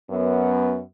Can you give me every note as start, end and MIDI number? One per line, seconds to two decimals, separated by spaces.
0.10 0.79 42
0.10 0.79 59